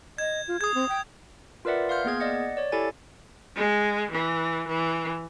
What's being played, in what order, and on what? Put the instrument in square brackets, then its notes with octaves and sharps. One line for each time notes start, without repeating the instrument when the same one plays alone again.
[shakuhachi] D#5 [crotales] G#6
[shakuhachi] F4
[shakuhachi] G#4 [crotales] D#6 G#6
[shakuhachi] C4
G5
[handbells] F4 A#4 B4 D5 E5 F#5
F5 C6 F6 G6
A#3 B3 G#4 G#6
D5 D#5 F#5
C#5 D5
E4 G4 A4 G#5 A6
[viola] G#3
E3
E3